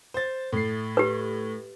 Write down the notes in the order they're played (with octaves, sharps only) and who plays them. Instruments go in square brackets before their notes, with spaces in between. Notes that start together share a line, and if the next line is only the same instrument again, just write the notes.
[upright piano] C5 A6
A2 C7
[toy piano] G4 B4